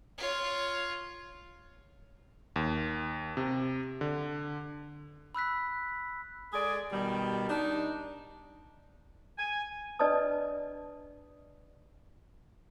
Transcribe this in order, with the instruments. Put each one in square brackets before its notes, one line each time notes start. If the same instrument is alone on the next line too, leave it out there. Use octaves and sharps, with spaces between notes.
[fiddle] F4 C#5
[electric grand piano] D#2
C3
D3
[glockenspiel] B5 E6 F#6 B6
[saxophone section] G#3 G#4 A4 D5
B2 D#3 G3
D4 D#4
[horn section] G#5
[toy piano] D4 B4 D5 D#5 A5 D#6